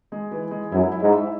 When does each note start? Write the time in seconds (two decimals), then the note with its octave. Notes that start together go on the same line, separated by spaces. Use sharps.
0.12 G#3
0.31 E3
0.51 G#3
0.72 F#2 E4
0.92 E4
1.02 G#2
1.12 E5